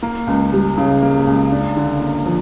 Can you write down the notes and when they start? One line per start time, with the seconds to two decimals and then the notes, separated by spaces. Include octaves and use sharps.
0.02 A#3
0.27 C#2
0.53 G3
0.77 C#3
1.02 A#3
1.27 C#2
1.52 D4
1.77 D3
2.01 A#3
2.26 F3